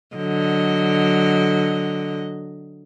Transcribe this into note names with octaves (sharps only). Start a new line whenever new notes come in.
D3 F#3 D#5